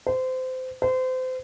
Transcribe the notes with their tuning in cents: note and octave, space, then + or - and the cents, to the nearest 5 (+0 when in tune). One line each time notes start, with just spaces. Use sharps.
C5 -25
C5 -30